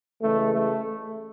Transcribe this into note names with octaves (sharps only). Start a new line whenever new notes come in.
C#3 E3 G#3 A3
A3